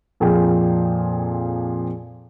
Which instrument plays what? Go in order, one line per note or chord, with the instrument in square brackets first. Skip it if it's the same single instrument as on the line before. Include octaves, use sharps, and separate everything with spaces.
[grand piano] F2 A#2 F3 G#4 G5